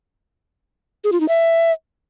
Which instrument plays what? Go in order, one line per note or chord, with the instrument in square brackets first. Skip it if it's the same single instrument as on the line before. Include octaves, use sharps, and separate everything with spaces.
[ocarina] G#4
F4
D#4
E5